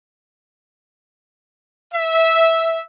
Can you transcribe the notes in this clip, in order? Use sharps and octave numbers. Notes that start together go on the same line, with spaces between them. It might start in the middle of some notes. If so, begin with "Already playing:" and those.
E5